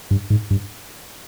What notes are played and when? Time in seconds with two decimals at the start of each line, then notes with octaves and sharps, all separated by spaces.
0.11 G2
0.30 G#2
0.50 G2